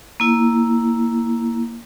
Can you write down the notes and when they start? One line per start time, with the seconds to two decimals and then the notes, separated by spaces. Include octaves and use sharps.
0.20 A#3 E4